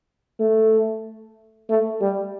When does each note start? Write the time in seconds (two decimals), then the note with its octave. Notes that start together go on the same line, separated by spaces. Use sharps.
0.40 A3
1.69 A3
2.01 G3